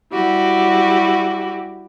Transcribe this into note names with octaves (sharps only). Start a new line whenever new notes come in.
G3 E4 F#4 G4